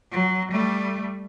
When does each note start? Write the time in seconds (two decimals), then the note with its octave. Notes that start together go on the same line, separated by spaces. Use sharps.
0.12 F#3
0.52 G3 A3